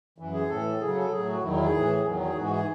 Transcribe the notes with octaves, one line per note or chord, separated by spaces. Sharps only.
F#2 E3
G#4
A2 E3 A4
F#2 C#3 F#3 G#4
A4
A2 F#3 G#4
F#4
E2 D#3 F#3 E4
E4
G#4
A2 E3
E2 D#3 F#3
G#4
G#2 E3 F#4
G#4